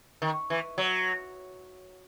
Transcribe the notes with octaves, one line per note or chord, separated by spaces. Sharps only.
D#3
E3
F#3